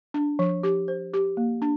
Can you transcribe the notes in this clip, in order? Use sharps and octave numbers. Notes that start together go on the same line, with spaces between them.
D4
F3
G4
C5
G4
A#3
D4